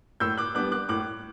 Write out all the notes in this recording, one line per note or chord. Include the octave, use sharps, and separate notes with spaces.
A2 E6 G6
D6 F#6
G3 B3 D4 D6 F#6
D6 F#6
A2 D6 F#6